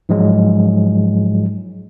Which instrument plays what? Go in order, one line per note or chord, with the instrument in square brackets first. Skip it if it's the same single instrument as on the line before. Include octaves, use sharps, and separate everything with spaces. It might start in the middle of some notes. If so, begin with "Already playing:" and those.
[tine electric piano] G#2 F3 F#3 G#3